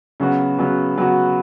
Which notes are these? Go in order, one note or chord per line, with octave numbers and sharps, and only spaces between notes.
C#3 F#3 B3 F#4
C#3 F#3 B3 F#4
C#3 F#3 B3 F#4